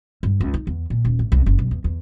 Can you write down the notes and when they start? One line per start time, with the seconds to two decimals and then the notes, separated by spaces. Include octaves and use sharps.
0.23 G2
0.41 C#2
0.54 D#4
0.67 E2
0.90 A#2
1.05 D#1
1.19 A1
1.32 C2
1.46 F#1
1.59 B1
1.71 E2
1.84 E2